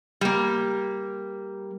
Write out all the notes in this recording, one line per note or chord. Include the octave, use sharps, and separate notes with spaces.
G3 A#3